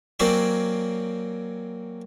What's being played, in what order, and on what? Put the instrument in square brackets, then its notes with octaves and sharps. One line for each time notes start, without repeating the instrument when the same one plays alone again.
[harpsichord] F#3 A#3 C4 C#4 F#4 D5